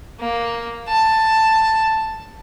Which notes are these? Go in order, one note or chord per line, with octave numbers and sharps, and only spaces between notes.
A#3
A5